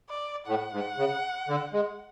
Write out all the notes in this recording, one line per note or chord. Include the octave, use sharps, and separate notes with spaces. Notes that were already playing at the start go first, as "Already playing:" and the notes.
D5
A2 F#5
G#2
C#3
D3
G#3